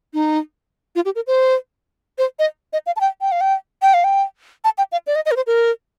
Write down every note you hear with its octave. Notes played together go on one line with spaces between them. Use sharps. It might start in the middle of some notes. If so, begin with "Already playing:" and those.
D#4
F4
G4
A#4
C5
C5
D#5
D#5
F5
A5
G5
G5
F5
G5
G5
F5
G5
A5
G5
F5
D5
D#5
D#5
A#4
C5
A#4